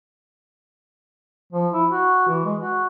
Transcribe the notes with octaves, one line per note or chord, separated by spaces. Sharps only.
F3
E4
F#4
E3
G#3
F#4